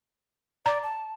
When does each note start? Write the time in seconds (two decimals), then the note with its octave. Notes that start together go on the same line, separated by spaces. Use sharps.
0.66 D5 A#5
0.83 A5